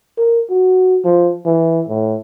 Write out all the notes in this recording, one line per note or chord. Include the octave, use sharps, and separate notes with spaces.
A#4
F#4
F3
E3
A2